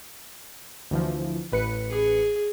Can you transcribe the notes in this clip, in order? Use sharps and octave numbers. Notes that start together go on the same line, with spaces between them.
D2 E3 F3
A1 B4 C#7
G#4